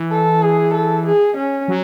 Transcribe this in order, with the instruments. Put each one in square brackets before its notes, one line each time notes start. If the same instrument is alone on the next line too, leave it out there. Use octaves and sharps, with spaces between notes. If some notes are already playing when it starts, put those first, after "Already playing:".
Already playing: [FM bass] E3
[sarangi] A4
G#4
A4
G#4
C#4
[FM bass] F#3